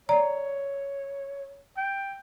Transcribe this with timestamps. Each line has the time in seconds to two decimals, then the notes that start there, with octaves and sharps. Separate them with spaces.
0.09 C#5 D5 A#5
1.77 G5